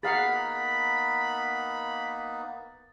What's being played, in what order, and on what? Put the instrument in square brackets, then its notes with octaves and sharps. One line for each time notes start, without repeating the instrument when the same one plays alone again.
[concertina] A#3 B3 D#4 [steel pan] G#4 F5 F#5 [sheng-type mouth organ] B5 [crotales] A6